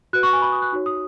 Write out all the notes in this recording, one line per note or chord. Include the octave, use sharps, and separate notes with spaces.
F#4 B4 F#6
C#6
G#5
B5
D#6
F#6
D#4 F#4 C#5
D#6